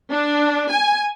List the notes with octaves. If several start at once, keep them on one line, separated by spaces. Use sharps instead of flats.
D4
G#5